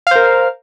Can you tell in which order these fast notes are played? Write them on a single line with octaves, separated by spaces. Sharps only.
F5 C5 A#4